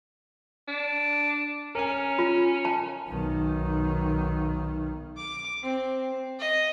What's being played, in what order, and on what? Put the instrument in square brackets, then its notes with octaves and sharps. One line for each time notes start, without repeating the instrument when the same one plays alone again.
[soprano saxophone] D4
[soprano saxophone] C#4 [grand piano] A#4 G#5
[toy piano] F4
A5
[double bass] B1 D#3
[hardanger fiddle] D6
C4
D#5